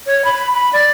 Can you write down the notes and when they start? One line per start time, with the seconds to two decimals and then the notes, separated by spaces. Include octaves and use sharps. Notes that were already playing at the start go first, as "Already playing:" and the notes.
0.06 C#5
0.25 B5
0.54 B5
0.73 D5